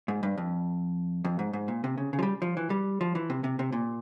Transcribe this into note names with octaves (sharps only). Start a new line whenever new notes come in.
G#2
G2
F2
F2
G#2
G#2
A#2
C3
C#3
C#3
F3
G3
F3
E3
G3
F3
E3
C3
C3
C3
A#2